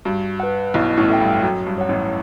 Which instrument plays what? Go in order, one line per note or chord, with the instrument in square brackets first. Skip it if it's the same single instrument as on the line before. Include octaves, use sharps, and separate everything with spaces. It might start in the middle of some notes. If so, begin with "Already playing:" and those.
[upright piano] G2 [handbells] F#4
[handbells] B4 F#5
[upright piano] B1 B2 [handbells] E4
[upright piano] A1 A2
[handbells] A4 E5 G5
[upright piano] G2
[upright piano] F#2 [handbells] F#4
[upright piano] G2
[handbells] C#5 F#5
[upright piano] A1 A2